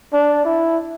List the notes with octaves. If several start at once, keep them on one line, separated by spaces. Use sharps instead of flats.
D4
E4